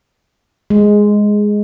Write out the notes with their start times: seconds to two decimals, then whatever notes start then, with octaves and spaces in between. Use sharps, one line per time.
0.70 G#3